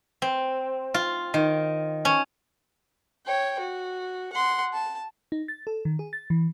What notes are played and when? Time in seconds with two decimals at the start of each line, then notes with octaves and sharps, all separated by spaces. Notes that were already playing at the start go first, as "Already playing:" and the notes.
0.22 C4
0.94 F4
1.34 D#3
2.05 C#4
3.26 C#5 G5
3.59 F#4
4.33 F#5 C6
4.73 A5
5.32 D#4
5.48 A6
5.67 A4
5.85 D#3
5.99 G#4
6.13 A6
6.30 E3